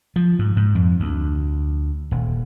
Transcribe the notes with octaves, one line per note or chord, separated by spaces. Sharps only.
F3
G#2
G#2
F2
D2
D#1